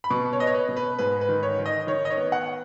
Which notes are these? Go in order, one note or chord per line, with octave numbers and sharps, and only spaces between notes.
B5
B2 C#6
C#5
B3 D#5
C#5
B4
B2
B4
G#2 B4
B4
D#3
C#5
D#3
D#5
D#3 C#5
D#5
C#5
B3
F#5